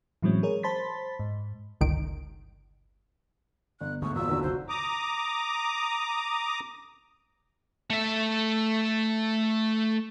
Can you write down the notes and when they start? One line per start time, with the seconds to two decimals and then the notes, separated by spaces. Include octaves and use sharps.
0.22 A2 E3 F#3 G#3 C4 C#4
0.43 G#4 A#4 C#5
0.63 C5 A5 B5 C6 A6 B6
1.19 G#2
1.81 G1 C#2 D#3 D7
3.81 G1 F#6
4.02 D2 G#2 C5 C#6
4.15 E2 A#2 F#3 F4 E6
4.29 D#2 D3 F#4 B4
4.43 F#1 C2 C5
4.69 A#5 D6 D#6
7.90 A3 E5